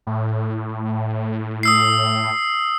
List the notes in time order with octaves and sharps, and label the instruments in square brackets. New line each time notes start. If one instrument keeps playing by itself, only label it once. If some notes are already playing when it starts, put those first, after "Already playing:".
[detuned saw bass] A2
[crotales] D#6 E6 C7